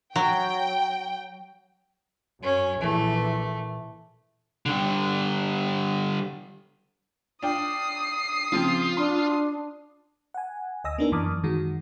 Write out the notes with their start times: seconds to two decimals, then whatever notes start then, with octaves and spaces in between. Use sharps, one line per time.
0.16 F#3 G5
2.43 F#2 C#4
2.81 A#1 E3 A3
4.66 D3 G3
7.43 D4 F4 G5 D#6 C7
8.53 C#3 F3 C4 F4
8.97 D4 C6
10.34 F#5 G#5
10.84 D2 D#5 G#5 D#6 E6 A#6
10.98 A#3 B3 D4 D#4 A#4
11.12 F#2 E3 A5 D6 D#6 F6
11.43 F#2 D#3 G#3 F#4